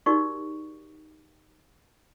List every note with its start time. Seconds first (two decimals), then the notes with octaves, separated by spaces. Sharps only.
0.06 D#4 F#4 G4 A#4 D5 C#6